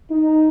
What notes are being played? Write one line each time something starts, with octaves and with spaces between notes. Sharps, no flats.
D#4